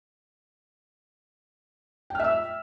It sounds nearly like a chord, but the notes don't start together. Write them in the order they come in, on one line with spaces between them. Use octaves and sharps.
G5 F6 E5 E6